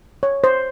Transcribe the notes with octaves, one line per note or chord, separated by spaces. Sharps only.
C#5
C5